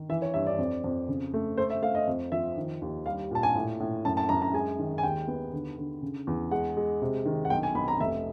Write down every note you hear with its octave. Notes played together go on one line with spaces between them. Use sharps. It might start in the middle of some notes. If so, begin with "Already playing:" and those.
Already playing: D#3
E3 E5
C#5
G2 E5
D5
F2
F2
C#3
A3
A3 C5
E5
A3 F5
D#5
F2
F3 E5
D#3
D#2
G3 F5
A#2 A5
G#5
A2
A2
F#2 A5
A5
F#2 A#5
A#5
G#3 G#5
D#3
G#5
D#2 G5
B3
D3
D3
C#3
E2
G#3 F#5
G#3
C3
D#3
F#5
B1 G5
G#5
B1 B5
A#5
F1 E5